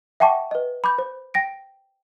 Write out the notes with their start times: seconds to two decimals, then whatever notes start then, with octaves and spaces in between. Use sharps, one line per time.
0.20 E5 F#5 G5 A5 C#6 D6
0.51 B4 D#5
0.84 B5 D6 G6
0.98 C5
1.34 G5 A#6 D7